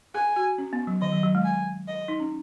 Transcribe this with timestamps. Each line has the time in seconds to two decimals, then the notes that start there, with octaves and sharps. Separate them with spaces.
0.15 G#4 G#5
0.36 F#4
0.58 C#4
0.73 B3
0.87 F#3
1.02 D#3 D#5
1.13 F#3
1.23 F#3
1.35 G#3
1.44 G#5
1.88 D#5
2.08 D#4
2.20 C#4